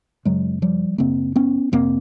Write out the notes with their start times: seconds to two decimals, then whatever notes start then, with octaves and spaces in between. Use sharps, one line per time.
0.25 F#2 C#3 F#3 G#3
0.62 F3 G3
0.98 F#2 C#3 A#3 C4
1.36 B3 C#4
1.72 F2 C3 A#3 C4